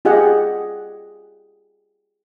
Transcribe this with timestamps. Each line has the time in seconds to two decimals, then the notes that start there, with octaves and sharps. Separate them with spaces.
0.05 F4 G4 G#4 D#5 F#5